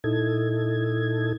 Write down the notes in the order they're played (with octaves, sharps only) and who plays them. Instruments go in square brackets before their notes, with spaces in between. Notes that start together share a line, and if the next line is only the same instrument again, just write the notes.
[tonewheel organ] A#2 D#4 E4 A4 G#6